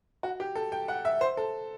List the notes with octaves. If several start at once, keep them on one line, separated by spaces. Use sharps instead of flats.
F#4
G4
A4
G5
F#5
E5
C5
A4